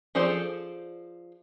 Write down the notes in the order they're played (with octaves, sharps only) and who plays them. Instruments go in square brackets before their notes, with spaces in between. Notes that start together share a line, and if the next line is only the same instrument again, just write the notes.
[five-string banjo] F3 G#4 A4 C5 D5